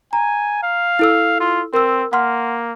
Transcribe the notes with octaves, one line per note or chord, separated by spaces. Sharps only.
G#5 A#5
F5
E4 A4 E6
F4
C4 A#4 E6
A#3 F#5 C6 F6